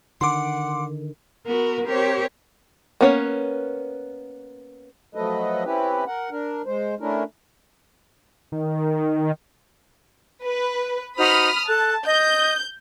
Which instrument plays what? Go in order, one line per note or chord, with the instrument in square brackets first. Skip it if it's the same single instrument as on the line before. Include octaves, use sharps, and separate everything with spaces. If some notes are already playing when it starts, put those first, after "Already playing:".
[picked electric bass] D3 D#3 [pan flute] F#5 [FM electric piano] C6 D6
[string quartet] B3 F#4 A#4
C4 G4 A#4 C5 C#5
[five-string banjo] A#3 B3 C#4 B4 C#5
[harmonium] F3 F#3 A3 A4 B4 D#5
C4 C#4 E4 G4 B4
A#4 F#5
D4 A#4
G#3 C5
A3 C#4 D4 E4 A#4
[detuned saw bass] D#3
[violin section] B4
[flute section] D#4 F#4 C5 [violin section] B5 D#6 F6
[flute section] A4 F#6 [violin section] A5
[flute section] D#5 D#6 [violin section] G6